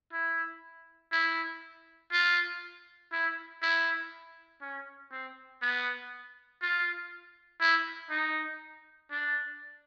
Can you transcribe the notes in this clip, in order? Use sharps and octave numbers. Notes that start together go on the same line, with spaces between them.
E4
E4
F4
E4
E4
C#4
C4
B3
F4
E4
D#4
D4